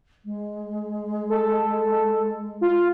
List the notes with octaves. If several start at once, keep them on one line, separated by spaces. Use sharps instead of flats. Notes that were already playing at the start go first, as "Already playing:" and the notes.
G#3
A4
F4